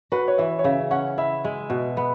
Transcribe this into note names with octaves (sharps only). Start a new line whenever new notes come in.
F#4 B4
C#5
E3 E5
C#5
C#3 E5
C#4 F#5
E4 E5
G#3
B2
B3